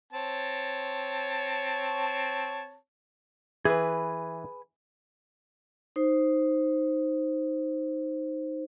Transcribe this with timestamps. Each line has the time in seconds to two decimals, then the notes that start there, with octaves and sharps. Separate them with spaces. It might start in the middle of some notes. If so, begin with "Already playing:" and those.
0.13 C4 C#5 A5
3.65 E3 G#4 B4
5.96 D#4 C5